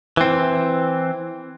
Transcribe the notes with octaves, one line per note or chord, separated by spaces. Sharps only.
E3 C4